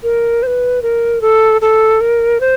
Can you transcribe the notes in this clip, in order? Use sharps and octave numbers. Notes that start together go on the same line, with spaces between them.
A#4
C5
B4
A#4
A4
A4
A#4
C5